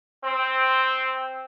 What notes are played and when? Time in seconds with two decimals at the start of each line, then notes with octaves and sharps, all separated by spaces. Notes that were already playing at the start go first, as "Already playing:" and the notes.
0.24 C4